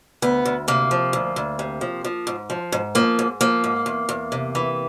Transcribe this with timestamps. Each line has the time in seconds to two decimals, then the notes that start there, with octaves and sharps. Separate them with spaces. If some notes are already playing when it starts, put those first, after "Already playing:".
0.22 D2 B3
0.45 D2
0.68 C3 A#3
0.91 F3
1.13 D2
1.36 D2
1.59 C3
1.81 F3
2.05 F3
2.27 G#2
2.50 F3
2.72 G#2
2.95 F3 A#3
3.19 G#2
3.41 F3 A#3
3.64 G#2
3.86 E2
4.09 E2
4.32 C3
4.55 E3